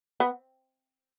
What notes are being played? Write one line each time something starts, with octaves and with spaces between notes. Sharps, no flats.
B3